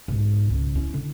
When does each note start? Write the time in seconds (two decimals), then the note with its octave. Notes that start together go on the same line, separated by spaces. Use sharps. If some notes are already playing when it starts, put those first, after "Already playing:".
0.08 B1 G#2
0.50 C#2
0.75 C#4 E4
0.94 D3